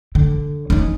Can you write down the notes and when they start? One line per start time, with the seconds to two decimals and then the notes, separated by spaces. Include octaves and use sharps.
0.15 D3
0.70 C#4 D#4